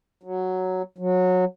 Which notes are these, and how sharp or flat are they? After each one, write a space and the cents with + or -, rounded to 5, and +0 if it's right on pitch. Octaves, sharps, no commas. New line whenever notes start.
F#3 +0
F#3 -20